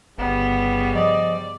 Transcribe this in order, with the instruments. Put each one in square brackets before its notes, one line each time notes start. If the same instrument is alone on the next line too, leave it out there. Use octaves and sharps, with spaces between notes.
[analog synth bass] G1 [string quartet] G2 C#3 G3 [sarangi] B3
[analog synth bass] F3 [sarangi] D5 [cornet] D#5